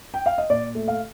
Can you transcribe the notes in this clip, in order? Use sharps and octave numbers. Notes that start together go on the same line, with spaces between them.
G5
F5
D#5
A#2 D5
A3
F5